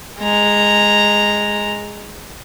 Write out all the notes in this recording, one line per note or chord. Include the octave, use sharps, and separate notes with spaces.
G#3 A#5